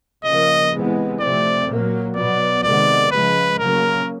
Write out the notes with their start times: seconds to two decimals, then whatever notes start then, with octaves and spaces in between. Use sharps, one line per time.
0.24 C#3 F3 A#3 D#5
0.72 C3 E3 G#3 B3
1.20 C3 F3 A3 C4 D5
1.68 A#2 F#3 A#3
2.15 B2 F#3 B3 D5
2.63 C3 D#3 G#3 B3 D5
3.11 C#3 F3 G#3 B4
3.59 C#3 F#3 A#3 C#4 A#4